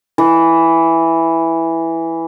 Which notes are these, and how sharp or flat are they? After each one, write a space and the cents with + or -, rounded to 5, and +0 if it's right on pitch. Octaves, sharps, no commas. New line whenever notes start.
E3 +0